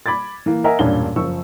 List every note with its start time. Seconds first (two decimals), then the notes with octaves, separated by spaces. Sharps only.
0.06 B5 D6 G#6 A6
0.46 E3 A#3
0.64 A#4 D#5 E5 F#5 G#5 A#5
0.79 E1 G2 A#2 C#4 D4 G7
1.16 F#1 F3 C#6 E6